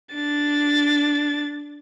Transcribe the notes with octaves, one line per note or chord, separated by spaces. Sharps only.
D4 A6